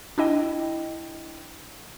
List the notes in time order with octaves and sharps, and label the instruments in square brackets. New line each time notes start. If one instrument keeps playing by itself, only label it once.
[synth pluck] D4 E4 D#5 G5